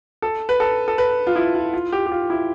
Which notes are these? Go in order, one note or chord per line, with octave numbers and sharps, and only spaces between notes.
A4
B4
A4
A4
B4
F4
E4
F4
F4
G4
G4
F4
E4